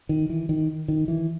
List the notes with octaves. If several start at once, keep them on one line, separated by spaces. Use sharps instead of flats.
D#3
E3
D#3
D#3
E3